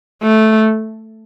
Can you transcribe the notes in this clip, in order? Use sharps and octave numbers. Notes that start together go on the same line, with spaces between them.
A3